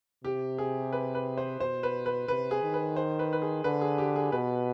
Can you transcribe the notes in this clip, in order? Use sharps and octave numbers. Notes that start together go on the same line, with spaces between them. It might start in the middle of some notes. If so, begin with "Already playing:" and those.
C3 G4
G#4
B4
B4
C5
B2 C5
B4
B4
C3 B4
G#4
D#3
B4
C5
B4
B4
G#4
D3 B4
G#4
G4
G#4
B2 B4